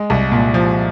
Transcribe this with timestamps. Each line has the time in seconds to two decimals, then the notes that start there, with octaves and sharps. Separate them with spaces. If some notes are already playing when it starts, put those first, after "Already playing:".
Already playing: G#3
0.10 C2
0.32 A#2
0.54 F3